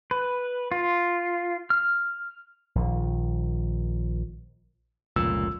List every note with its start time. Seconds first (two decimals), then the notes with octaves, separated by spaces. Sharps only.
0.11 B4
0.72 F4
1.70 F6
2.75 A#1 D#3
5.16 F1 C#2 A#2 E6